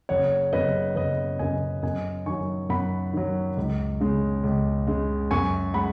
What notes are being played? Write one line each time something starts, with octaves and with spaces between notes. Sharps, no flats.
F#1 C#5 F#5
F#2 C#3 B4 D#5
F#1 B4 D#5
F#2 C#3 D#5 G#5
F#2 D#5 G#5
D#3 F#3 G#5 C#6
F#2 F#5 B5
D#3 F#3
C#2
C#3 G#3
C#2
C#3 G#3
F#2 G#5 C#6
G#3 F#5 B5